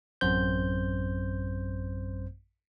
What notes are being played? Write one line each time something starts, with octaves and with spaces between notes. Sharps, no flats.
A1 F#2 C4 C5 G6